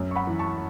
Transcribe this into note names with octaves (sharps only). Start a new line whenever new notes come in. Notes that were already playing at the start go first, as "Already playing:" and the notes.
Already playing: F#2
C#6
F#5 B5
E3
A5 C#6